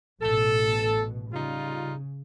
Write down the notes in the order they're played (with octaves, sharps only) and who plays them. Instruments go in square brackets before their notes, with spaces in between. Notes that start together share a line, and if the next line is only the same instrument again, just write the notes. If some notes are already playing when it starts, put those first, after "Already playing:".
[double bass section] A1 B2 [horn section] A4
[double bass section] C#3 [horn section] G3 D#4 F4